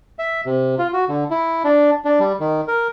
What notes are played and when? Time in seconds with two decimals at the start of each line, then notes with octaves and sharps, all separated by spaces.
0.19 E5
0.46 C3
0.78 F4
0.93 F#4
1.09 D3
1.30 E4
1.64 D4
2.05 D4
2.19 G3
2.40 D#3
2.68 A#4